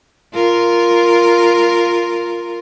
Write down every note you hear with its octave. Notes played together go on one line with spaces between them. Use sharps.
F4 A#4